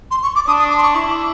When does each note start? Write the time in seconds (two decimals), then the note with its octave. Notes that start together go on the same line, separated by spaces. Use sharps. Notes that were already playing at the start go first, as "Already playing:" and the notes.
0.11 C6
0.23 C#6
0.35 D6
0.47 D4 D#6
0.59 D#6
0.70 D6
0.78 C6
0.83 C#6
0.95 E4 C#6
1.10 D6